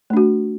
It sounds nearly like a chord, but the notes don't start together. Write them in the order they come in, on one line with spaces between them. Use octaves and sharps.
A3 D4 F#4